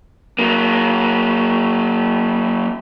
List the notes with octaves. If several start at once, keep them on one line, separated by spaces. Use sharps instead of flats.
F#3 A#3